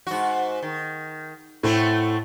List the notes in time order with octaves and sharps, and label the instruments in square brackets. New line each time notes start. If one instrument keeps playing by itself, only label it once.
[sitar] G#2 F#4
D#3
[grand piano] A2 [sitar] A3 C4 F#4